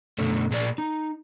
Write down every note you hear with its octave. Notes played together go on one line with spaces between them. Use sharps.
F#2 B2 D3 F#3 A3
A#2 G#4 D5
D#4